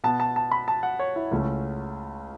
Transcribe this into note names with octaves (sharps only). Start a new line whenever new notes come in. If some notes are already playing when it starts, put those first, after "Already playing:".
B2 B3 A5
A5
A5
B5
A5
F#5
C#5
E4
C#2 C#3 A3 C#4